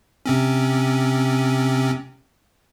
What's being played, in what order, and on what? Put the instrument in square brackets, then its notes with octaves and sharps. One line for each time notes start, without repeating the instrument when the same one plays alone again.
[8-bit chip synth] C3 C4 C#4